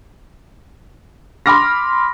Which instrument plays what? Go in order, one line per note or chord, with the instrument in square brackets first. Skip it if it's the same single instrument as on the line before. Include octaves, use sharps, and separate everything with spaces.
[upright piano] B5 C6 D6 F6 A#6